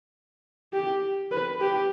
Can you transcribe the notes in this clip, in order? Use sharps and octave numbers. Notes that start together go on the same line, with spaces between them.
G4
B4
G4